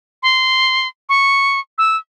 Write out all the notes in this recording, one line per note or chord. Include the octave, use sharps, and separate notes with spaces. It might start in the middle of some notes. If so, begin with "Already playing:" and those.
C6
C#6
E6